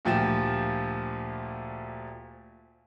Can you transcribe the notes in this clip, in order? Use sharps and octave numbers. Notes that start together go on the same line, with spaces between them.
D2 A#2 F3 G4 E7